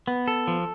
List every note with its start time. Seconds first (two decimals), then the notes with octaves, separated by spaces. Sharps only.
0.08 B3
0.28 A4
0.48 F3